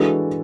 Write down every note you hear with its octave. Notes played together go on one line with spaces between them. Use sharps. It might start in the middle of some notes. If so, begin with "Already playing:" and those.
Already playing: E3 G#3 D4 F#4 A4